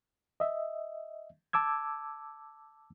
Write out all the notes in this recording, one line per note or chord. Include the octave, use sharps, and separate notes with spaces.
D#5 E5
A5 D6 E6 G#6